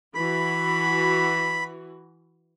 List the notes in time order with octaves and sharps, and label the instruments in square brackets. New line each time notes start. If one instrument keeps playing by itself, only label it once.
[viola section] E3 F#4 [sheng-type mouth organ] B5